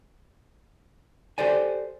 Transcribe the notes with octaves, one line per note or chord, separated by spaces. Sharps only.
G4 A4 C5 D5 G#5